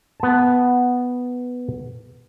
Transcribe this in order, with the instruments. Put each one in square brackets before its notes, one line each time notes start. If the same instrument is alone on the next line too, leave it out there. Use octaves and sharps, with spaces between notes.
[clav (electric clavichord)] B3 A5